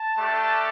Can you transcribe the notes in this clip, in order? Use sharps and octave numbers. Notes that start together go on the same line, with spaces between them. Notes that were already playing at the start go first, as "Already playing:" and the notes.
Already playing: A5
A3 D4 G4